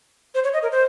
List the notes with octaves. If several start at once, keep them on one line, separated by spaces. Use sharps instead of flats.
C5
C#5
D#5
A#4
C5